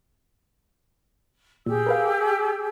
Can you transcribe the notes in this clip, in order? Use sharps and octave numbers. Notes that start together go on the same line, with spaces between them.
A#2 G4 G#4 E6
A#4 B4 F5